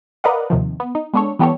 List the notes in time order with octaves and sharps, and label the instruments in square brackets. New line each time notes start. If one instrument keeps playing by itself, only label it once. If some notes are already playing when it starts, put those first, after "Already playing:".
[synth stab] A#4 B4 D5 D#5 F5 F#5
D#2 C3 D#3 F3
B3
D#4
G#3 B3 D4 A4 C#5
E3 G3 B3 G4 A4 C#5